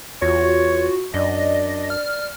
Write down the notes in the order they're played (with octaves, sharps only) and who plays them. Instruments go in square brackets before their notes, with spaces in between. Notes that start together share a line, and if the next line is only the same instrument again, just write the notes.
[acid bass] E2 [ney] F4 [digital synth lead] F#4 [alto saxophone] C#5
[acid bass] F#2 [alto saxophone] D4 [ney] D5 [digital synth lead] D#5
[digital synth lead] F6